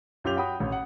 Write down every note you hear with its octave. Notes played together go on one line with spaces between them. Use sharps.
F#2 F4 G4 G6 F7
F#4 G5 B5 D#6
A1
F#5